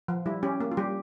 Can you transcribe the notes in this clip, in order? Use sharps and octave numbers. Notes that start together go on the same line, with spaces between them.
F3
G3 E4
C#4 G4
A#3
F4
G3 G4